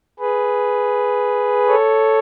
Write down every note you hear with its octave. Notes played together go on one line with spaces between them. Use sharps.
G#4 B4
A4 C#5